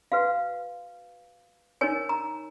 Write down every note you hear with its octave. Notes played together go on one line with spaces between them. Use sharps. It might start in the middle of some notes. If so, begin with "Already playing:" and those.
F#4 B4 F5
D#4 A#4 C#5 G#5
A#5